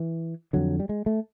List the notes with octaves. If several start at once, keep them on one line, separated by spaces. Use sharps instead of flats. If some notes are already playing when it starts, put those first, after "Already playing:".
Already playing: E3
F2 D3 F#3
G3
G#3
A3